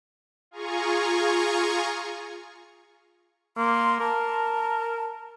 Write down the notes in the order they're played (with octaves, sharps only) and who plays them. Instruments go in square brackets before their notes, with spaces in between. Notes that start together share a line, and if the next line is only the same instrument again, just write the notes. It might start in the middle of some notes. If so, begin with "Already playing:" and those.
[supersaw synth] F4 G#4 G#5 A#5 C#6
[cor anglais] A#3 [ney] C6
[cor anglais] A#4 [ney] A5